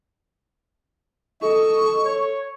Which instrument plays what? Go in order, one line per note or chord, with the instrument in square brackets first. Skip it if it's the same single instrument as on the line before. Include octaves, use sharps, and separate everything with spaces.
[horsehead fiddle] A4 [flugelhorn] D#5 [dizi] C#6
[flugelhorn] C#5